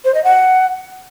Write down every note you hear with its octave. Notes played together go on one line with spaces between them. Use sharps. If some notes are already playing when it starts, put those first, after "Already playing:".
C5
D#5
F#5